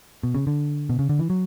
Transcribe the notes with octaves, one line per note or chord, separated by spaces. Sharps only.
B2
C#3
D3
B2
C#3
D3
E3
F#3